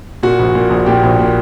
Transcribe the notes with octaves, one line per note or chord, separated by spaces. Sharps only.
A#2 F#4
A#1
A#2
A#1
A#2 G4
A#1
A#2